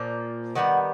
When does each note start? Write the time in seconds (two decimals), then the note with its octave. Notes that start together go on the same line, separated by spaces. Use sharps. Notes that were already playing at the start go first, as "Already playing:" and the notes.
Already playing: A#2 F3 A#3
0.55 D#3 G3 B3 F#5